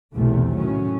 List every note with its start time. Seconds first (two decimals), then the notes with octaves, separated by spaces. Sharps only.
0.14 B1 E2 C3 A3
0.57 A2 D#3 F#3 C#4